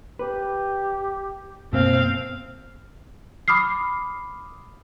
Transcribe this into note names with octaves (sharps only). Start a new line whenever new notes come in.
G4 B4
F#2 B2 A#3 C4 F5
B5 D6 D#6 F6 C7